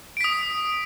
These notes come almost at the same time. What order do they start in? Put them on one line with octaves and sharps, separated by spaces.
D7 B6 D#6